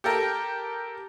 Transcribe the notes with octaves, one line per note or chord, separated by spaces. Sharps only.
G4 A4 A#4